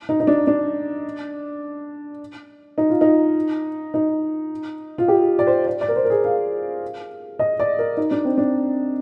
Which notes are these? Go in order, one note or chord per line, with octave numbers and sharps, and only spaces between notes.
D#4
D#4
D4
D4
D#4
F4
D#4
D#4
F4
G4
D5
C5
D5
D5
A#4
C5
A#4
G#4
F5
D#5
D5
A#4
D#4
D4
C4
D4